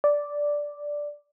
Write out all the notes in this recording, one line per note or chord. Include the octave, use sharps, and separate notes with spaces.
D5